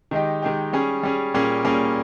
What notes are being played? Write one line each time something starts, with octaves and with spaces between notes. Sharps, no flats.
D#3 G#3 D#4 G4
D#3 G#3 D#4 G4
G3 C#4 G#4
G3 C#4 G#4
A#2 G3 A#3 C#4 G#4
A#2 G3 A#3 C#4 G#4